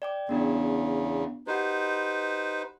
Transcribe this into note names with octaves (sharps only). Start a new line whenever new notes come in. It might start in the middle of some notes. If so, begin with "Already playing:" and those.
D5 G5 D6
E2 C#3 B3 D4 F#4
D#4 F#4 G4 B4 C5 F#5